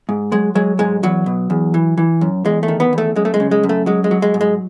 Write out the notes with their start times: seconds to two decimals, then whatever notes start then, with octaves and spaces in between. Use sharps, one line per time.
0.09 G#2
0.32 F#3 G#3
0.55 F#3 G#3
0.79 G#2 G#3
1.03 E2 F#3
1.26 B2
1.50 E2
1.74 E3
1.98 E3
2.21 F#2
2.45 E2 G#3
2.63 A3
2.68 D#3
2.80 B3
2.93 E2 A3
3.16 F#2 G#3
3.25 A3
3.34 G#3
3.40 C#3
3.51 G#3
3.63 F#2
3.69 A3
3.86 F#3 G#3
4.04 G#3
4.11 F#3
4.22 G#3
4.34 G#2
4.41 G#3